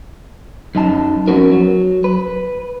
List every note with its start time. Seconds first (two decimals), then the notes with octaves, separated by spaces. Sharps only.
0.75 F#2 D#4 A5
1.27 F2 B3 C#4 F#4 A#4
1.52 F#3
2.04 B4